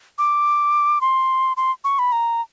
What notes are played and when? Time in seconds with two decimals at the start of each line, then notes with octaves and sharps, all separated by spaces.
0.18 D6
1.01 C6
1.57 C6
1.84 C#6
1.99 B5
2.12 A#5